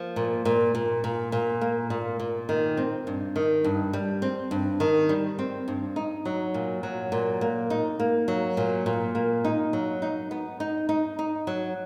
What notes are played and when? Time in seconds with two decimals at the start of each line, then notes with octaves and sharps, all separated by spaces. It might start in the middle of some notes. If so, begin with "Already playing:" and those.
Already playing: F3 A#3
0.16 A#2
0.45 A#2
0.75 A#2
1.04 A#2
1.32 A#2
1.61 A#3
1.90 A#2
2.20 A#2
2.49 D#3
2.77 C4
3.07 G2
3.36 D#3
3.64 G2
3.93 G3
4.22 C4
4.51 G2
4.80 D#3
5.09 G3
5.39 C4
5.68 G2
5.96 D#4
6.25 F#3
6.54 A#2
6.83 F#3
7.12 A#2
7.41 A#3
7.70 D#4
8.00 A#3
8.28 F#3
8.57 A#2
8.86 A#2
9.15 A#3
9.45 D#4
9.73 F#3
10.02 D#4
10.31 B3
10.60 D#4
10.89 D#4
11.19 D#4
11.47 F#3